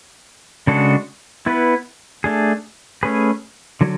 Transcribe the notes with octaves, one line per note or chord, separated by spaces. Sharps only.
C#3 G#3 D4 F#4 A4
B3 E4 B4
A3 D4 G#4
A3 C#4 G#4 B4
D3 F#3